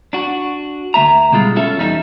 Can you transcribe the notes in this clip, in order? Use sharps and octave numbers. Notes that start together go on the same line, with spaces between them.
D4 F#4
D2 A3 E5 A#5
B2 G3 G#3 F4
C#4 F4 A4 E5
E2 G3 D#4 G#4 E5